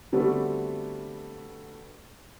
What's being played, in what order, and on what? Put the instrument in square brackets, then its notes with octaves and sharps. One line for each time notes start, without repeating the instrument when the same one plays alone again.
[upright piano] D3 G3 A3 B3 C4 F#4